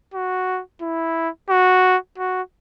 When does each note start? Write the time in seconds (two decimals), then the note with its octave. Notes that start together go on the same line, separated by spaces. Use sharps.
0.14 F#4
0.82 E4
1.50 F#4
2.18 F#4